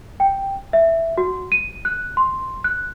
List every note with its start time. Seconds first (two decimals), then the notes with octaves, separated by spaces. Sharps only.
0.20 G5
0.73 E5
1.18 F#4
1.52 D#7
1.85 F#6
2.17 C6
2.64 F#6